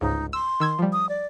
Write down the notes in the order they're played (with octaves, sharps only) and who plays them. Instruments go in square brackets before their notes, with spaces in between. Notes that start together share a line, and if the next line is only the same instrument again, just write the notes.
[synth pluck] G1 C#2 G#2 [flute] D#4
[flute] C6 [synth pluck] E6
[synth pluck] D#3 E6 G#6
F3 G3
[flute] D#6
D5